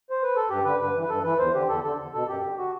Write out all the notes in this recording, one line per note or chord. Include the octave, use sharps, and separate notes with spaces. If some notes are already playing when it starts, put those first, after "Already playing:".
C5
B4
A4
G2 G4
D3 B4
G2 B4
E3
B4
G2 A4
E3 B4
E2 C5
D3 G4
E2 A4
D3 A4
E2
B2 A4
F#2 G4
D3
F#4